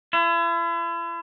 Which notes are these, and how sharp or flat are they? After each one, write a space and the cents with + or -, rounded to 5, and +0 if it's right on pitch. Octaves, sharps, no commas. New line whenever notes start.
E4 +40